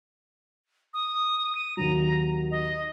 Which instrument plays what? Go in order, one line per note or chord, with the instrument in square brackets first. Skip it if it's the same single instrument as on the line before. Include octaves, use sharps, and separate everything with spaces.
[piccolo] D#6
D#7
[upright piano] D#2 D#3 F#3 [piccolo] A#5
[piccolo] D#5